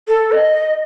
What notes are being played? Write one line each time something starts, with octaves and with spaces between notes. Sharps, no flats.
A4
D#5